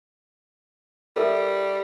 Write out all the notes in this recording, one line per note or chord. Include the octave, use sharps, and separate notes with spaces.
G3 A4 A#4 E5